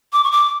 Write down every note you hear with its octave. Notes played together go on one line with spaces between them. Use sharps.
D6
C#6
D6